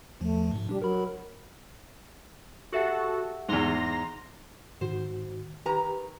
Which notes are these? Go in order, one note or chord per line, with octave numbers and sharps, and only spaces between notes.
E2 F3 A3
G#2 B2
G3 D4 G4
F#3 A#4 B5
F#4 G4 A4 E5 F#5
E2 G#2 A#5 C6 A#6
G#2 D#3 F#4 C5
D#3 G4 B4 A#5